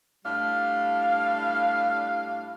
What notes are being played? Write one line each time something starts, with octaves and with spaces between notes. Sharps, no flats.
A2 G3 D4 F5